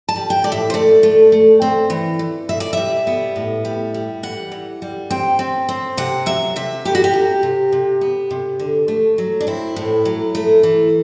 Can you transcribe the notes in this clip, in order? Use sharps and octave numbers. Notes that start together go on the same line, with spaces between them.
A5
G3
G5
A2 D5
E5
C5
A3 D5
A3
A3
C4
E3
E3
B2 E5
D5
G3 E5
B3
A2
G3
G3
E3 F#5
E3
G3
C4 G5
C4
C4
C3 F#5
F#3 E5
C3 E5
B3 G4
F#4
G4
C3
C3
C3
B3
C3
D3
A3
F#3
D4
C4 E4
A2
F#3
A3
E3